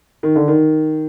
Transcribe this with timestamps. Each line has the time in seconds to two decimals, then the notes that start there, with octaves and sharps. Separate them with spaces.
0.23 D#3
0.36 D3
0.48 D#3